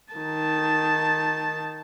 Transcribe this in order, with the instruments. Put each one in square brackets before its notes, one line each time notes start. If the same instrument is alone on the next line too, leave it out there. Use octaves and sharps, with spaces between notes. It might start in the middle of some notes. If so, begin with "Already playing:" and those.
[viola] D#3 A5